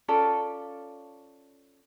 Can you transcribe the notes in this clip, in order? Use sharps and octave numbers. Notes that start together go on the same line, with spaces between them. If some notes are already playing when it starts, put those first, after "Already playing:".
C#4 F4 A4 D5